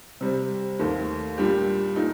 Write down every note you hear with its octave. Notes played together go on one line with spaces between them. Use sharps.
C3 G3 C4
D#2 D#3 A3
A#2 G3 D4 G4
A#2 A3 D#4